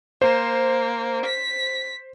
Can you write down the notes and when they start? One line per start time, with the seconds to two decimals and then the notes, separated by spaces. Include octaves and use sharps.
0.22 A#3 C5
1.26 B6